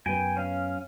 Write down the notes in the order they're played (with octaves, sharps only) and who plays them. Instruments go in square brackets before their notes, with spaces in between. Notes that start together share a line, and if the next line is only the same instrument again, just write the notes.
[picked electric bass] F#2 B3 [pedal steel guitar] G5 G#5
[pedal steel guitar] C#4 F5